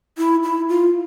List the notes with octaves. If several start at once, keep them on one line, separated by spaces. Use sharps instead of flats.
E4
E4
F4